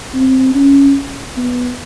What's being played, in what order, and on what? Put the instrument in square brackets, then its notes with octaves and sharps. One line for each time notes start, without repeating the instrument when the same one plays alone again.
[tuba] C4
C#4
B3